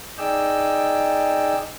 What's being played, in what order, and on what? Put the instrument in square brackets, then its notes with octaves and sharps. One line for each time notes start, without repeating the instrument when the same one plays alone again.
[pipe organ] D#4 G#4 D5 D#5 G5 E6